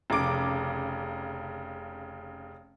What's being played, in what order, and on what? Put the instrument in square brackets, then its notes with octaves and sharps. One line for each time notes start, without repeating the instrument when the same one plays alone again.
[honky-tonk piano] F1 C#3 D6 D7